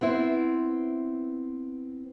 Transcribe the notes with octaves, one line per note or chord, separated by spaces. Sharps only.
B3 C4 E4 C5